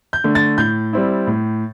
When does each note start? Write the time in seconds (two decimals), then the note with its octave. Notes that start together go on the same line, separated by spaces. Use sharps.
0.13 G6
0.24 D3 A3
0.35 A6
0.58 A2 G6
0.93 G3 C4 E4
1.27 A2